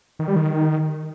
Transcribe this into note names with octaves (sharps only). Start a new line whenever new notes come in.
D#3
G3
D#3